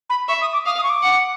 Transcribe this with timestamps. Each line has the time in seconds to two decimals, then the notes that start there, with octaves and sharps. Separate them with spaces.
0.10 B5
0.28 E5 C#6
0.41 D#6
0.53 D6
0.65 F5 D#6
0.78 D#6
0.83 C#6
0.90 D6
1.02 F#5